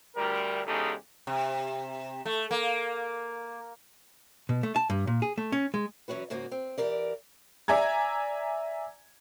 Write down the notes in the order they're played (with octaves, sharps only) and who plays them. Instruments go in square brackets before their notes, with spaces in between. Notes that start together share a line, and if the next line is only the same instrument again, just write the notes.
[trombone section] D2 G3 A#4
E2 C#3 G#3 D#4 G4 A4
[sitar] C3
A3
A#3
[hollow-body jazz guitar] B2
A3
A5
G2
A#2
G#4
A3
C#4
G#3
[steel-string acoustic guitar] E3 F#3 C#4 F#4 B4
G#2 C#3 A#3 D#4 F#4
C4
E3 G4 A#4 D5
[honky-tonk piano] D5 E5 G#5 A#5 G#6